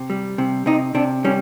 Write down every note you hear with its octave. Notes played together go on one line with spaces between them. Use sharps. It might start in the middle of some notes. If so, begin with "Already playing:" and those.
Already playing: C3
G3
C3
C3 D#4
C3 D4
G3 C#4